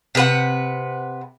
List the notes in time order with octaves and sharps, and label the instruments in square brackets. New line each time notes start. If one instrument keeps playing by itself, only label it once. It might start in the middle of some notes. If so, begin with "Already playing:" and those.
[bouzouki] C3 B4 F#5